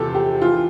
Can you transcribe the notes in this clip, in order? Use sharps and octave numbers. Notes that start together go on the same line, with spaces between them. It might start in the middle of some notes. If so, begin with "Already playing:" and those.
Already playing: E2 C3 F3 G4 A4
G4
E3 F4